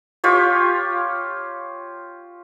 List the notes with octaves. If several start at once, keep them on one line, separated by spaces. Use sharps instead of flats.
F4 G4 C#5